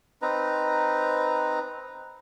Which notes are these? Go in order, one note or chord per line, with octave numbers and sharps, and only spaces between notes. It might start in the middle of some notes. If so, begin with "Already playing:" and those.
C4 D#4 B4 A#5